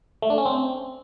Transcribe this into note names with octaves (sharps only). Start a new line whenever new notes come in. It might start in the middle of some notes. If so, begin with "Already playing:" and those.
A3
D4
C#4
C4